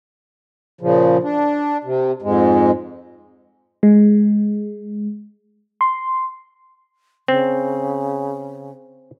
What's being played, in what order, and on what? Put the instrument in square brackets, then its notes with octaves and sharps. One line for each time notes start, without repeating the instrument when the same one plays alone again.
[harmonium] A#2 C#3 F3
D4
C3
F2 G#2 G#3
[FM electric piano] G#3
C6
[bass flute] C#3 [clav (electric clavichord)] C4